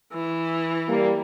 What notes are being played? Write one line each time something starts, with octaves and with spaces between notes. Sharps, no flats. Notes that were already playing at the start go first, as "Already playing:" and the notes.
E3
G3 A#3